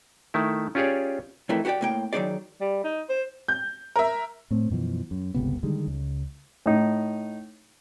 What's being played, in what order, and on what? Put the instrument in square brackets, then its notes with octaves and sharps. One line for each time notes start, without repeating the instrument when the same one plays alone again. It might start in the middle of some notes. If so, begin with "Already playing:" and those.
[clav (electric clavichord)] D#3 A3 E4
C#4 F4 G4 G#4 C#5 D5
[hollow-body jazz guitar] F2 D#3 E3 A3
F#4 G4 C5 D5 G5
A2 A#3 G5
D#3 F#3 A#3 D#4 G#4 D5
[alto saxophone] G3
D#4
C5
[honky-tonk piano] G6
A#4 E5
[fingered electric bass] A2 A3 C4
F#2 B2 E3 F3
F#2
G1 C#2 C3 B3
D3 D#3 G3 G#3
C#2
[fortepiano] A2 D#4